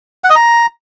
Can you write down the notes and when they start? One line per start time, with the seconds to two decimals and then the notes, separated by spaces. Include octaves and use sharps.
0.24 F#5
0.30 D#5
0.35 A#5